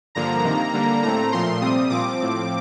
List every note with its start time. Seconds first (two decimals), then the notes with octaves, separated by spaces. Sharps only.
0.15 G2 D3 F3 A#3 A#5
0.44 C3 D#3 A#3
0.74 D3 G3 A#3
1.03 A2 A3 C4 A#5
1.32 A#2 F3 A3 C6
1.61 C3 G3 C4 D#6
1.90 A#2 F3 C4 D6
2.19 A2 F3 C4